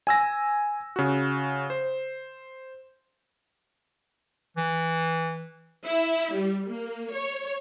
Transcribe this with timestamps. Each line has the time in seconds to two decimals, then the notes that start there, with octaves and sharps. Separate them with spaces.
0.07 G#5 E6 A#6
0.96 C#3 F#4
1.70 C5
4.57 E3
5.88 E4
6.35 G3
6.67 A#3
7.14 C#5